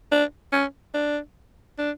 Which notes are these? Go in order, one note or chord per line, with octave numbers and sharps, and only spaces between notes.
D4
C#4
D4
D4